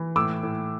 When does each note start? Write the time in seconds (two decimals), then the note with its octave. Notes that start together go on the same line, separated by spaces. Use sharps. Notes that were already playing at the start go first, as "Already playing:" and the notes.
Already playing: E3
0.16 A2 D6 E6
0.43 A2